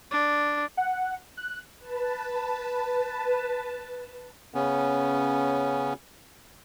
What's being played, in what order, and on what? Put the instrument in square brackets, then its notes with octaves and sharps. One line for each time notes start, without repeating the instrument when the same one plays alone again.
[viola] D4
[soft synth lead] F#5
F#6
[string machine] B4 A5
[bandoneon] C#3 B3 C#4